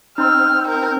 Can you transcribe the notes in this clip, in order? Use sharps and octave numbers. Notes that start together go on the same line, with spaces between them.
C4 D#4 C6 E6 F6
A#4